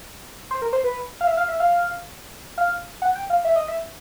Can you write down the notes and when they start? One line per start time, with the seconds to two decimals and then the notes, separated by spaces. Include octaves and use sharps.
0.51 C5
0.62 A#4
0.73 C5
0.84 B4
1.21 F5
1.27 E5
1.37 F5
1.48 E5
1.60 F5
2.58 F5
3.02 F#5
3.15 G5
3.30 F5
3.45 E5
3.56 D#5
3.68 E5